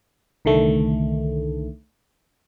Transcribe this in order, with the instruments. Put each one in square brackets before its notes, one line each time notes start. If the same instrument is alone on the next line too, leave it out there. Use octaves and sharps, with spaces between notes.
[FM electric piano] C2 D3 D#3 A3